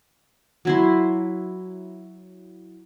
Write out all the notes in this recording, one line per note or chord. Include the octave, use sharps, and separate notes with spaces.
F#3 E4 C6